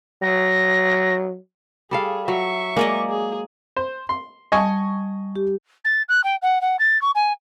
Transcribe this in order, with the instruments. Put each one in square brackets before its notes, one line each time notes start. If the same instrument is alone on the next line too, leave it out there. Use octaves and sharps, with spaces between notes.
[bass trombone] F#3 [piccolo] A#6
[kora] G3 A4 F5 [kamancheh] G#4
[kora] F#3 [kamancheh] E5 C#6
[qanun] G#3 D5 D#5 [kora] A#3
[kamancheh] G#4
[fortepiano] C5
C6
[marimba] G3 A5 [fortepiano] D#5 G#5 C#6
[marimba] G4
[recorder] A6
F#6
G5
F#5
F#5
A6
C#6
G#5